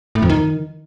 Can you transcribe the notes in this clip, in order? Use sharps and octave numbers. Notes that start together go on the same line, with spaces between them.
A2
F2
D#3